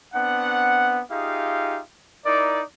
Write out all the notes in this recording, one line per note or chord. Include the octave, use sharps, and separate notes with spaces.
B3 C4 D4 F#5
D#4 F4 G4 G#4 E5 F5
D#4 E4 A#4 D5